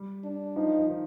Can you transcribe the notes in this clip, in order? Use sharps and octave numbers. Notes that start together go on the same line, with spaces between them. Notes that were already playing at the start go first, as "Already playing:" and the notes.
Already playing: G3
D4
F3 D#4
F3
D#3